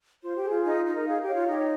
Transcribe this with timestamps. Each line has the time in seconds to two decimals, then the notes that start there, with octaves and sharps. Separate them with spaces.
0.22 F4 C5
0.36 G4
0.43 G#4
0.50 F4
0.65 D#4
0.85 D#4
0.95 A#4
1.07 G#4 F5
1.22 G4
1.28 C#5
1.35 F4
1.47 D#4 G4